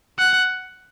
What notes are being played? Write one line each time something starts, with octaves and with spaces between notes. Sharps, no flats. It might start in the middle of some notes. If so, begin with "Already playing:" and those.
F#5